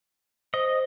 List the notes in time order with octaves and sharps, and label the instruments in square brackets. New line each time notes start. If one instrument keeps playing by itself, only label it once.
[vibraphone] C5 [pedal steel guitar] D#5